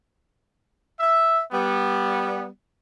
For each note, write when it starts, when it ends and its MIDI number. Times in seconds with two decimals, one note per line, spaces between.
1.00 1.41 76
1.53 2.46 55
1.53 2.46 59